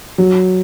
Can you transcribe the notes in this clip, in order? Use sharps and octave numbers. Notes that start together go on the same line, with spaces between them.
F#3